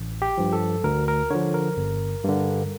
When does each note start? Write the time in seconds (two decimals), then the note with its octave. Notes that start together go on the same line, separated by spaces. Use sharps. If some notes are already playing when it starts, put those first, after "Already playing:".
Already playing: A1
0.22 G4
0.38 G2 F3
0.53 A4
0.84 D2 A#4
1.08 A#4
1.30 D3 F3 C#5
1.54 A#4
1.77 G1
2.24 G2 D3